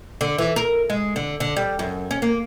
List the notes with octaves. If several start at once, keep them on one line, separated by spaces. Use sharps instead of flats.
D3
E3
A#4
G#3
D3
D3
G3
F#2
C#4
A#3